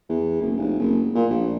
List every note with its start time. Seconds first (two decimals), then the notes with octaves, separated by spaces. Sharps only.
0.09 E2
0.40 F#1
0.57 F1
0.79 F#1
1.15 A#2
1.30 A#1